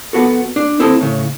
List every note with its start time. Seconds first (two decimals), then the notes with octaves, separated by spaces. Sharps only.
0.13 B3 F#4 A4
0.56 D4
0.80 C4 E4 A4 D#5
1.01 A2 C#3